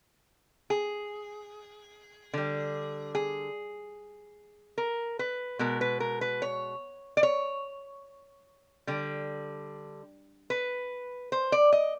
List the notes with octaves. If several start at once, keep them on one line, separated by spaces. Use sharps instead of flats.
G#4
D3 G3
G#4
A#4
B4
B2 G#3 A#4
B4
A#4
B4
C#5
D5
C#5
D3 G3
B4
C5
D5
D#5